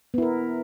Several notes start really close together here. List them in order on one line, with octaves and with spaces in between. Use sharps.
B3 E4 A#4